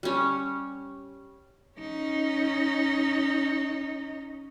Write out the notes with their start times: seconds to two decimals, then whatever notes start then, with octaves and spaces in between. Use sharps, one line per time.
0.03 G3 C#4
1.78 C#4 D#4